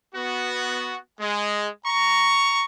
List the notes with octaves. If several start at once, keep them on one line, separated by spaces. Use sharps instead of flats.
B3 F#4
G#3
A#5 C#6